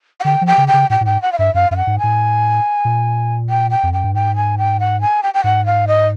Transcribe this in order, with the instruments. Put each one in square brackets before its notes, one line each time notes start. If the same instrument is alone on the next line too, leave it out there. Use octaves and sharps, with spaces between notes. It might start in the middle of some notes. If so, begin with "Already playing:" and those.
[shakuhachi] F#5
[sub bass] D3 [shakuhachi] G5
[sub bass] F3
[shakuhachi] G5
[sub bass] C#3
[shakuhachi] G5
[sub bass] C#3
[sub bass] A2 [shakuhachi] G5
[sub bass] A2
[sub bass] G#2 [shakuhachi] G5
[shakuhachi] F#5
F5
[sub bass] G2 [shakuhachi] E5
[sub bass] F#2 [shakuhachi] F5
[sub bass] F#2 [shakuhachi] F5
[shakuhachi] F#5
[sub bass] G#2
[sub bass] A2 [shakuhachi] G#5
[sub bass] A#2
[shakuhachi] G5
G5
[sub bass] F2
[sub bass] F#2 [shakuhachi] G5
[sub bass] G2
[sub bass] G#2 [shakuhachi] G5
[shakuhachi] G#5
G5
F#5
G#5
G5
G5
[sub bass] G#2 [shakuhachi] F#5
[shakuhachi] F5
D#5